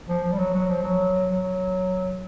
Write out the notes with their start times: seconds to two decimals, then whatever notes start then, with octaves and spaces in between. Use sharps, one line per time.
0.09 F3
0.24 F3
0.32 G3
0.39 F#3
0.54 F#3
0.69 F3
0.84 F#3
1.30 F#3